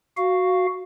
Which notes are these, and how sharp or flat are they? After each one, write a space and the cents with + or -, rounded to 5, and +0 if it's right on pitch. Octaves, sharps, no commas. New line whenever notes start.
F#4 +0 F5 +0